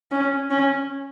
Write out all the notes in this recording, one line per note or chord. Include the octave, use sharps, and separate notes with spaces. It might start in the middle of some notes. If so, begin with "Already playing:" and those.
C#4
C#4